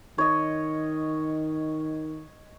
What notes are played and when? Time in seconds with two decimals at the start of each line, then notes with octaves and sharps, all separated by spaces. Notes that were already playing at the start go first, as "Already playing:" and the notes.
0.18 D#3 C#5 D#5